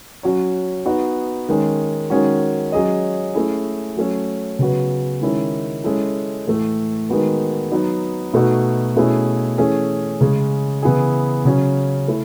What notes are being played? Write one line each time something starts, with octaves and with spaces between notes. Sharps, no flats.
F#3 C#4 F#4 C#5
B3 D#4 F#4
D#3 G#3 C#4
D#3 G#3 C#4 F#4
F#3 C#4 G#4 D#5
A3 C#4 E4 G#4
F#3 A3 C#4
C#3 F#3 B3 F#4 B4
D#3 G#3 C#4 E4
G#3 C#4 E4 A4
A2 E3 A3
D#3 G#3 B3 F#4 B4
F#3 B3 D#4
B2 A3 D#4 F#4 B4
B2 A3 C#4 E4 G#4
E3 A3 C#4 G#4
C#3 G#3 C#4 G#4 C#5
C#3 E3 B3 E4 G#4
C#3 F#3 C#4
A3 E4